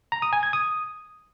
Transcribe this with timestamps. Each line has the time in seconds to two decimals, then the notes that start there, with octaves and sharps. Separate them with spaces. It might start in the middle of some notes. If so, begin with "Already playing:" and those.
0.12 A#5
0.22 D#6
0.33 G#5
0.43 G#6
0.53 D#6